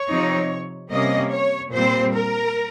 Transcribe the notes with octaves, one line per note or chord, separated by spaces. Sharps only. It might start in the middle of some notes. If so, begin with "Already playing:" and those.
Already playing: C#5
C3 F3 C4 D#4
C3 G3 A#3 C#4 D#5
C#5
A#2 G3 C4 C5
A#4